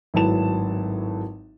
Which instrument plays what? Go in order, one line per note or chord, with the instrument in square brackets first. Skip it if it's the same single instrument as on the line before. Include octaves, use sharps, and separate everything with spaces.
[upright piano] G#1 A2 F#3 B4 A5 E7